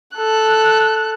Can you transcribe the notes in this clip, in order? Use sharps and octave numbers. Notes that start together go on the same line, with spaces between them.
A4 F#6